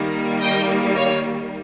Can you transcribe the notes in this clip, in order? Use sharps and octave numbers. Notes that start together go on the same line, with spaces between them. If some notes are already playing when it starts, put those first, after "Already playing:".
Already playing: D#3 G3 A#3
D#5 G5
C#5 F5